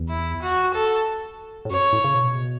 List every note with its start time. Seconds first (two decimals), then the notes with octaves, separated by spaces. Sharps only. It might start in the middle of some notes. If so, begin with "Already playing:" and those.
Already playing: E2
0.08 E4
0.42 F#4
0.74 A4
1.65 A2
1.70 F#2 C#5
1.93 A2
2.04 C#3
2.14 B2